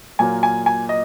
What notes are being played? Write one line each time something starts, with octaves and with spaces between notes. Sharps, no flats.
A#2 F#3 A#3 G#5
G#5
G#5
D#5